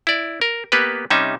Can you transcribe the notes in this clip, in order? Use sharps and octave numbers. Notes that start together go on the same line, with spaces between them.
E4 D5
A#4
A#3 B3 G4 B4
C3 G3 C#4 D#4 E5